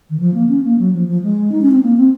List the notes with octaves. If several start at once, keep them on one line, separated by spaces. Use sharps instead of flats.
D#3
F3
A#3
C#4
A#3
F#3
F3
F3
G#3
D#4
C#4
C4
A#3
C4